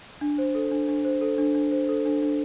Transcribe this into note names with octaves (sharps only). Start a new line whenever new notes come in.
D4
C5
A4
D4
D4
C5
A4
D4
D4
C5
A4
D4
D4